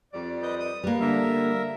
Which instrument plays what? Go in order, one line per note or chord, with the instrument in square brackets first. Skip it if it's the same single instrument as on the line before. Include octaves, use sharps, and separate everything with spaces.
[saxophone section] F2 G3 D5
[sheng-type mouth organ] B4 D#5 G6
D#6
[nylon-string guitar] G3 A#3 [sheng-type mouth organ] B4
[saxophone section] D3 [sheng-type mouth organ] A#4 E5